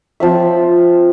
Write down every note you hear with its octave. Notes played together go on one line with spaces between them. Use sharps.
F3 C4 E5